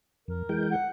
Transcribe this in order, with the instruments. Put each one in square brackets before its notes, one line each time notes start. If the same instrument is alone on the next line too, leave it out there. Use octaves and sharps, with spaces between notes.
[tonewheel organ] F2 [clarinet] A#4
[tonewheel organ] E3 G#3 G5
[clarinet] F#5